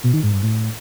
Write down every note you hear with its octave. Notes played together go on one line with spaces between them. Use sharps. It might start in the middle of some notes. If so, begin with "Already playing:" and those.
B2
D#3
G#2
G2
A2